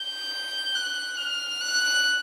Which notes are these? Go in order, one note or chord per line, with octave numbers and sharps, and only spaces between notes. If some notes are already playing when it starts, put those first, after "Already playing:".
Already playing: G6
F#6
F6
F#6